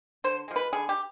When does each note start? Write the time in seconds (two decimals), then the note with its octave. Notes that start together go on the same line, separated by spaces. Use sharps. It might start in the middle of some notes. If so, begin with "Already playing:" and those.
0.24 D3 C5
0.48 F3 G#3
0.56 B4
0.73 D3 G#4
0.89 G4